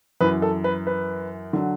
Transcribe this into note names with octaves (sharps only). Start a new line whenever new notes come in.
F#2 E3 B4
A4
B4
B4
D3 F#3